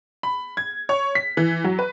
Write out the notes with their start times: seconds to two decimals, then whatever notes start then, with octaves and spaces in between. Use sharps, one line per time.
0.23 B5
0.57 G#6
0.89 C#5
1.15 B6
1.37 E3
1.64 F#3
1.79 B4